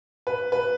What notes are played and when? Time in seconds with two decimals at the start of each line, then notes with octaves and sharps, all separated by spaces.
0.27 B4
0.52 B4